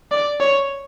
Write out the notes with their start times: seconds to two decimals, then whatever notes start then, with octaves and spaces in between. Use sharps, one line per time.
0.11 D5
0.40 C#5